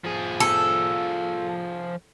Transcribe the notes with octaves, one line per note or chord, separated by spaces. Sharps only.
F3 G#4
A4